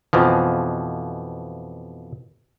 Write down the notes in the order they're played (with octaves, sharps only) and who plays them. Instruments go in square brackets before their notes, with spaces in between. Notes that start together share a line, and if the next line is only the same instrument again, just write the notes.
[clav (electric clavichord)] F2 B2 E3 F3